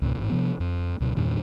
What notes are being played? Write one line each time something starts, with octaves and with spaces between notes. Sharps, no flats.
C#2 G#2 B2
A1 G#2
C3 F3 B3
F2
C#2 B2 F#3
E2 G2 A#2 D#3